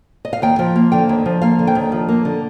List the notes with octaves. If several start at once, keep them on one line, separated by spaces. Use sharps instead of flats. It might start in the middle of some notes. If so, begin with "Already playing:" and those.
D#5
F5
D#2 G5
F3
A#3
D3 G5
D#2
F3
A#3 F5
D3
G5
D#2
F3
A#3
D3